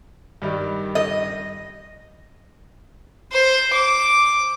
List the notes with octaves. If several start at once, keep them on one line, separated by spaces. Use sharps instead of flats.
G2 D#3 G3
D#5
C5
D6